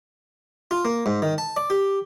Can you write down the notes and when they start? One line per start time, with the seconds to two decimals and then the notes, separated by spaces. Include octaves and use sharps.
0.71 F4
0.85 A#3
1.06 G#2
1.22 D#3
1.38 A5
1.57 D5
1.70 G4